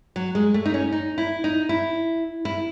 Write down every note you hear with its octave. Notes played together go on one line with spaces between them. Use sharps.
F#3
G#3
A3
D#4
C#4
D#4
E4
D#4
E4
E4